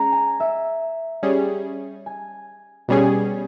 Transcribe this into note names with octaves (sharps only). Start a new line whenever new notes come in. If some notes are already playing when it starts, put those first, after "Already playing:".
Already playing: G#3 C#4 A#5
G#5
E5
G3 C#4 G#4
G#5
B2 G3 C#4 G#4